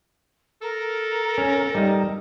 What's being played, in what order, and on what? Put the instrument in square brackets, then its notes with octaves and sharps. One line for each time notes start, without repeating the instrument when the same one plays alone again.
[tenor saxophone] A4 [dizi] A#4
[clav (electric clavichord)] C#4
G3 D#4